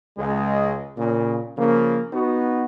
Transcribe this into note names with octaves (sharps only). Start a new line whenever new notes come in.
C#2 G#3
A#2 C#3
C#3 F3 A#3
B3 D#4 F#4